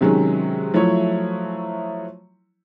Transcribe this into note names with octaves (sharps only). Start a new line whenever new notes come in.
C3 D#3 F#3 G#3 C#4
F3 F#3 A3 E4 C#5